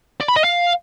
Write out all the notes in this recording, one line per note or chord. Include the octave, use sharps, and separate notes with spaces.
D5
B5
D#5
F5